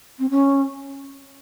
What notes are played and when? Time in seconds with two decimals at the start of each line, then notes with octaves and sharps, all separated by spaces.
0.19 C4
0.30 C#4